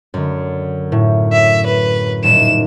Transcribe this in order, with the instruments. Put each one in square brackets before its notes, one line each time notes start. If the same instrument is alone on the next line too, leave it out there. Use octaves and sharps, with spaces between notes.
[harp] F#2 D3
A2
[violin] E5
B4
[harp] D#1 [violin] E7